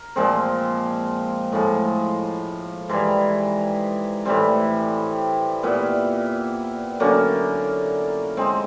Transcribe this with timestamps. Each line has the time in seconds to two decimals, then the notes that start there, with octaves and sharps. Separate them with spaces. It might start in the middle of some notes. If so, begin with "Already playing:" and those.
Already playing: A#4
0.16 A#2 F3 G#3 C4
1.52 A2 F3 G#3
2.89 G#2 E3 G3
4.25 A2 E3 G3 C4
5.63 A#2 G3 B3 E4
7.00 D3 F#3 A#3 C#4
8.37 G#3 C4 D#4